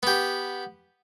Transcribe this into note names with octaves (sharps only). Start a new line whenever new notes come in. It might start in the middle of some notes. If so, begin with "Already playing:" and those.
B3 G4